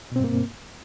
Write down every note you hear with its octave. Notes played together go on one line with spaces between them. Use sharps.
G2 B2 A#3 C4